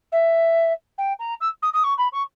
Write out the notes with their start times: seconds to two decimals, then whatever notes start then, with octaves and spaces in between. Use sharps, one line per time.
0.12 E5
0.98 G5
1.19 A#5
1.40 E6
1.62 D#6
1.73 D#6
1.84 C#6
1.97 B5
2.12 C#6